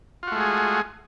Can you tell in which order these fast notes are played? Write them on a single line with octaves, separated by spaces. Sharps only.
F4 F#4 A3 G#3 G#4